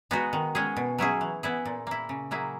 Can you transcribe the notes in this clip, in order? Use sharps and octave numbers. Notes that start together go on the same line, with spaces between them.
G#3 B3 D#4 F#4
D#3
G#3 C#4 G#4
B2
F#3 C#4 E4 G#4
E3
B3 E4 G#4
A#2
A#3 E4
C#3
F#3 A#3 E4 G#4